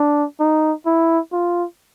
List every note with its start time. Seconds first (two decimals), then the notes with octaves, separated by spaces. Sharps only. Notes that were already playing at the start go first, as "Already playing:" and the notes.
Already playing: D4
0.40 D#4
0.86 E4
1.32 F4